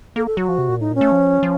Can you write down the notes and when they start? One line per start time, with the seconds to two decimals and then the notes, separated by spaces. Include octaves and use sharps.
0.16 A#3 A4
0.27 A4
0.37 F#3 F#4
0.49 F3
0.58 C3
0.69 A#2
0.80 A2 D#4
0.91 A#2 C#4
1.01 A3
1.12 F3
1.43 F3